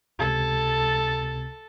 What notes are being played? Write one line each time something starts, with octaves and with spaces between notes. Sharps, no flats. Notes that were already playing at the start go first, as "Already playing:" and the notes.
C#2 C3 A4 G#6